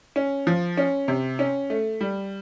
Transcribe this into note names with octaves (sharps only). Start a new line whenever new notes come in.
C#4
F3
C#4
C3
C#4
A3
G3